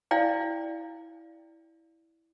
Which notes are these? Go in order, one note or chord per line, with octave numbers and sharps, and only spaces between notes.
E4 D5 F5 G5